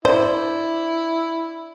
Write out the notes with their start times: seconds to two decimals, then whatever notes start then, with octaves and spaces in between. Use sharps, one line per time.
0.05 E4 C5 D5